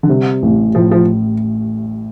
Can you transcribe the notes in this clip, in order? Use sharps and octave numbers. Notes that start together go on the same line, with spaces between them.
D3
C3 G3
A1
A2 F3
F3